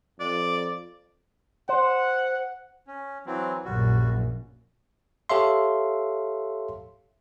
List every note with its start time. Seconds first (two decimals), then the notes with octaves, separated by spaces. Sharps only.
0.20 F2 D5
1.69 C5 F#5
2.87 C#4
3.26 E3 F#3 C4
3.65 A#1 F#2 A#2 G3 F#4
5.29 G4 A4 C#5 E5 F5 C6